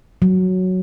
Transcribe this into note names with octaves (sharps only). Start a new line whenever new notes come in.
F#3